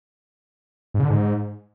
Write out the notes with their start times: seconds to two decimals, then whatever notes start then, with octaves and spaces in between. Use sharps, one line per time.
0.94 G#2
1.00 C#3
1.05 D3
1.10 G#2